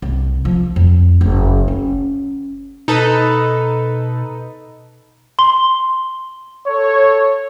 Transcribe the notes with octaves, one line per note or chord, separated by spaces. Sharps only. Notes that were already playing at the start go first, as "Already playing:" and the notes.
C2
F3
F2
F#1
C#4
B2 D#4 A4 B4
C6 G7
A4 C#5